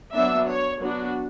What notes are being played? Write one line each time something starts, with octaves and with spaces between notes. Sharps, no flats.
F#3 B3 D4 E5
C#5
F#3 B3 D4 F#4